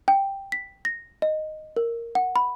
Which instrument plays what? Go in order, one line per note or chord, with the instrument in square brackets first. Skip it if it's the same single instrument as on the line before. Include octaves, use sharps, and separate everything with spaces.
[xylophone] G5
B6
A#6
D#5
A#4
F#5
B5